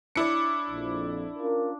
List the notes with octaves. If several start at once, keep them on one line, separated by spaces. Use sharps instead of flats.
D4 E4 D5 C#7
A#1 F2
C#4 F4 A#4